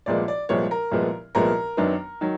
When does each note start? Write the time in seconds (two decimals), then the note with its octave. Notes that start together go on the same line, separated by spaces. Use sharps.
0.06 C2 A#2 F3 G#3 B3 D5
0.28 D5
0.49 C2 A#2 F3 G#3 B3 C#5
0.71 A#4
0.91 C2 A#2 F3 G#3 B3
1.35 C2 A#2 F3 G#3 B3 A#4
1.77 F#2 D#3 F#3 B3 D4
2.21 D#3 F#3